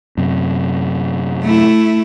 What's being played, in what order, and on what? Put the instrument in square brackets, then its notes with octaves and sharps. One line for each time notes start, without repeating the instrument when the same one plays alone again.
[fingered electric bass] F#2 C3
[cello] A3 E4